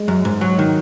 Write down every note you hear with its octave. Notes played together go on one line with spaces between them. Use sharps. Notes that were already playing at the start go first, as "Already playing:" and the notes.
Already playing: G#3
F#2
G#2
F#3
D#3